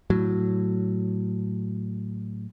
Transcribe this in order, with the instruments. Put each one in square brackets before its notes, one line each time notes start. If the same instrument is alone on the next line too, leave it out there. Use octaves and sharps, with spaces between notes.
[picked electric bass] A2 F#3